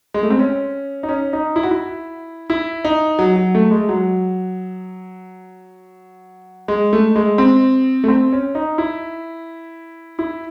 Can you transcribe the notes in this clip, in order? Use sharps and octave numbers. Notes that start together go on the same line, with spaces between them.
G#3
A3
C4
C#4
D#4
C#4
D#4
E4
F#4
E4
E4
D#4
F#3
F#3
A3
G#3
F#3
G#3
A3
G#3
C4
A3
C4
C#4
D#4
E4
E4